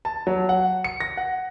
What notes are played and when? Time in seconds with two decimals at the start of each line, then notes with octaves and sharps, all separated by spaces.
0.05 A5
0.27 F#3
0.49 F#5
0.84 C#7
1.00 A#6
1.17 F#5